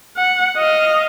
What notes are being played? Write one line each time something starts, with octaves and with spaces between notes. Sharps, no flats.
F#5
D#5 F5